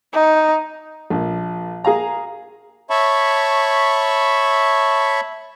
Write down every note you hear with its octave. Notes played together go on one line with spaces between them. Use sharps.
D#4
A#1
G#4 F5 A#5
C#5 E5 A5 B5 C#6